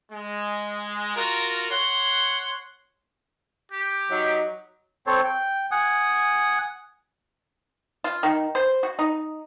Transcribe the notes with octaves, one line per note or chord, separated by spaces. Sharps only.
G#3
F4 F#4 A#4
C#5 F#5 C6
G4
F#3 D#4 D#5
C4 A4 C5 C#5
G5
F#5 G#5 D#6
F4
D#3
C5
F#4
D#4